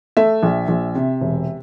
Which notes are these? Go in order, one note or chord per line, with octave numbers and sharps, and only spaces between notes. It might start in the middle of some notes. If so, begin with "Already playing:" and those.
A3 E5
A#1
A#1
C3
E1